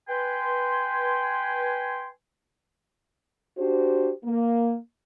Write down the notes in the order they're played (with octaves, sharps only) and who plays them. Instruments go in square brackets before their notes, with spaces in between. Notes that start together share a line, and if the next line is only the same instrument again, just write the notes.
[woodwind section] B4 G5 G#5 C6
[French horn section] D4 F#4 G4 C5
A#3